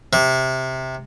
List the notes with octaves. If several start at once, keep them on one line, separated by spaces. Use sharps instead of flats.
C3